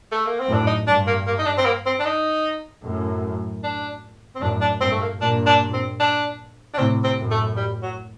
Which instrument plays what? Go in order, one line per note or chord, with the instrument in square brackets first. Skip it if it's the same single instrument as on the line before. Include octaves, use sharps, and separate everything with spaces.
[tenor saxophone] A3
A#3
C4
[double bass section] F#2 A2
[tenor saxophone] D4
D#4
[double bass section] G2 [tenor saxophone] D4
[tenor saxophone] A#3
A#3
D#4
D4
C4
A#3
C4
D4
D#4
[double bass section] F#2 A2
[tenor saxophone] D4
C4
[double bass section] F#2 A2 [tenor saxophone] D4
[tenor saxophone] D4
[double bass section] G2 A#2 [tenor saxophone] C4
[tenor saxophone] A3
A#3
[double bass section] G2 A#2 [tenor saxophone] D4
[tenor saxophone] D4
C4
D4
D4
[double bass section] A2 C3 [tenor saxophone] C4
[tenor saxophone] C4
[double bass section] F#2 A2
[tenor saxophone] A3
G3
F#3